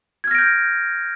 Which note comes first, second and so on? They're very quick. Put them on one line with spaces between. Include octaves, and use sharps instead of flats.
G#6 F6 A#6 D7 G6